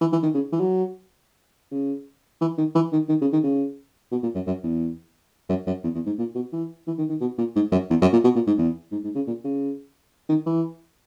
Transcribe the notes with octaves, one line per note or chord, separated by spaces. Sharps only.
E3
E3
D#3
C#3
E3
F#3
C#3
E3
D#3
E3
D#3
D#3
C#3
D#3
C#3
B2
A#2
F#2
F#2
E2
F#2
F#2
E2
E2
G#2
A#2
B2
E3
E3
D#3
D#3
B2
A#2
G#2
F#2
E2
F#2
A#2
B2
A#2
G#2
E2
G#2
G#2
C#3
A#2
C#3
D#3
E3